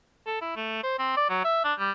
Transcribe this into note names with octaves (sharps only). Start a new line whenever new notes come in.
A4
E4
A3
C5
C4
D5
F#3
E5
D4
G3